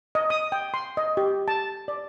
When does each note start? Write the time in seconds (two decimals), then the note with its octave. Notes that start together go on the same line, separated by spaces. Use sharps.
0.15 D#5
0.30 D#6
0.52 G5
0.74 C6
0.97 D#5
1.17 G4
1.48 A5
1.88 D5